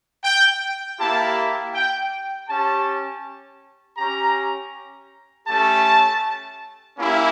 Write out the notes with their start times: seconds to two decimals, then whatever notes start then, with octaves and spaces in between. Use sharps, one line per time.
0.23 G5
0.98 A#3 E4 G4 A5
1.74 G5
2.47 C#4 G4 A5
3.97 C#4 G4 A#5
5.46 A3 C#4 G4 A5
6.96 A#3 C#4 E4 G4